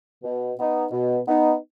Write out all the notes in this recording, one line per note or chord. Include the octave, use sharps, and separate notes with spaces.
B2
B3 D#4
B2
B3 D#4